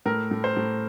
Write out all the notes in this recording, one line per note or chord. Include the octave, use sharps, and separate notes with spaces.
A2 A#4
A2
C5
A2